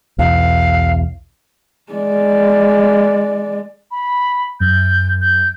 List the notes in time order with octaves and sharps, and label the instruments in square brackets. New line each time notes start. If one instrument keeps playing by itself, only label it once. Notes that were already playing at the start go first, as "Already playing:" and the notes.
[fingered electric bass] B1 E2 [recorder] F5
[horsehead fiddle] G#3 D5
[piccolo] B5
[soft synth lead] F#2 [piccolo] G6
[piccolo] G6